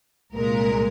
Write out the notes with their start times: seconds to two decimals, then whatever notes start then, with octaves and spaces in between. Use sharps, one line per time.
0.34 C2 A#2 G#3 A#4